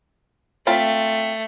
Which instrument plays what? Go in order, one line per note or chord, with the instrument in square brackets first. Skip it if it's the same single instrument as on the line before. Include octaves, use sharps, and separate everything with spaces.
[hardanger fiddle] A3 [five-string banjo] C4 F4 B5